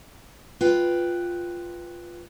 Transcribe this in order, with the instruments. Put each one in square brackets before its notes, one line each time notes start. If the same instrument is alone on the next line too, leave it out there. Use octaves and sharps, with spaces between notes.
[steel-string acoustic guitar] F4 B4 G5